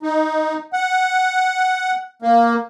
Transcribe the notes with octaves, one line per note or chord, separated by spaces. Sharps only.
D#4
F#5
A#3